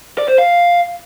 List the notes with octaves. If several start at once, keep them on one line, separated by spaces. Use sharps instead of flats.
D5
C5
F5